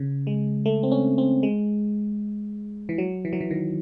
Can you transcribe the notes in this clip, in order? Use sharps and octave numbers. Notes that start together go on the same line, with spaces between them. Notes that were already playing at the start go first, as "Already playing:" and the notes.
Already playing: C#3
G#3
A3
C4
C#4
C4
G#3
E3
F#3
E3
F#3
E3
D#3